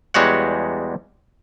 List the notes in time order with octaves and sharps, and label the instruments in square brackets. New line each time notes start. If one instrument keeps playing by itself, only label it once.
[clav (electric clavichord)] E2 G3 G#3 F#4 C#5 F#5